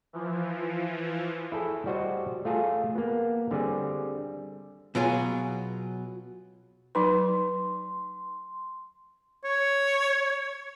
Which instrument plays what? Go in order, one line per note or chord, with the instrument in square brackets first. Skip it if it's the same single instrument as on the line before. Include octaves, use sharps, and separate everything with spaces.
[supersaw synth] E3 F3
[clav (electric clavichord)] E4 G#4 A4
G3 F#4 C5 D#5
A3 F4 G#4 A4
A#3 B3
D3 G3 C4 G#4
[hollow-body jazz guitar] B2 F#3 F4 G#4
[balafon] F#3 D#4 B4 [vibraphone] C6
[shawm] C#5